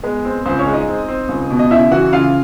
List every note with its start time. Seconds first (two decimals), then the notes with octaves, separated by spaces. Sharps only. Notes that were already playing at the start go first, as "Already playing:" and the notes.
0.03 G#3 B3 B4
0.25 C4
0.45 C#2 C4 C5
0.59 C#4 C#5
0.66 G#3
0.73 D#4 D#5
0.88 C4
1.08 C4
1.29 C#2
1.51 B2
1.59 D#5
1.70 C#3 E4 E5
1.91 E3 F#4 F#5
2.12 C#3 F4 F5